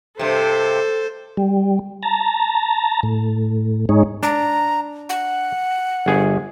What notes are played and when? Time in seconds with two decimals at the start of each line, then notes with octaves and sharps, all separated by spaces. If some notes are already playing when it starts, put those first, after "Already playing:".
0.19 G2 C3 A4 C5
1.37 G3
2.03 A5 A#5
3.03 A2
3.89 G#2 G#3 D#4 C#5
4.23 D4 A#5
5.09 F#5
6.06 G1 G#4